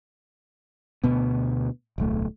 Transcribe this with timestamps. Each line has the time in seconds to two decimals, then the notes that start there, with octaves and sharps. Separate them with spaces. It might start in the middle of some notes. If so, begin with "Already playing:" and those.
1.04 D2 B2 B3
1.98 D1 B1 A3